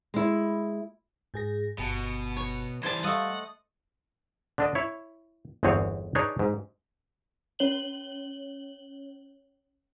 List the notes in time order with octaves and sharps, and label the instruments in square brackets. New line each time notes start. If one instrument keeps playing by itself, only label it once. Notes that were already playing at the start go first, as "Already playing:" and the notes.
[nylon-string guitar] G#3 E4
[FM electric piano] G#2 G#4 A#6
[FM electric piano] G1 A5 C#7 [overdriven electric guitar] B2
[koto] C#5
[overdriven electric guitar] E3 G3 [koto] C5 A5 [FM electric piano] G#6
[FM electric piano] G3 F5 E6 [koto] A3 D#5 [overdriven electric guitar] F#5
[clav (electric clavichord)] D3 D4 D#5
E4 C#5
G1 E2 D3 C4 G#4 C#5
D4 D#4 G#4 B4 C#5
G#2
[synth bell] C#4 C#5 F#7 G7